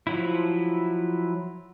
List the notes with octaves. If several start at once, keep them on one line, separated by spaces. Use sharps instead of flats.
F3 F#3 E4